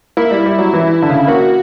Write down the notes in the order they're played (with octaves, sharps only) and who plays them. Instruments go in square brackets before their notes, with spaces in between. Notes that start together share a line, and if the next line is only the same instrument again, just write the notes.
[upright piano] A#3 [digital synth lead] E4
[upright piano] G3
G3
F#3
E3
D3
C#3
[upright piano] A#3 [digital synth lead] F#4